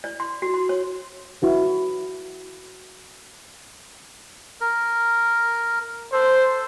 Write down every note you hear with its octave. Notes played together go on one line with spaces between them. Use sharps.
D5
C6
F#4
C6
C#5
E4 F#4 B4
A#4
A4 C5